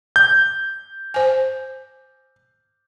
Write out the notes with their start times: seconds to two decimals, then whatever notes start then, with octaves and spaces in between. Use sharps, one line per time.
0.16 G6
1.14 C5 G#5